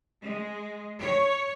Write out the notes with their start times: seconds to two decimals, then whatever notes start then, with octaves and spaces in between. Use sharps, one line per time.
0.23 G#3
0.99 C#5